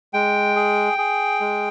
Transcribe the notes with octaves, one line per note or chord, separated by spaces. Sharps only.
G#3 G5
G#4
G#4
G#3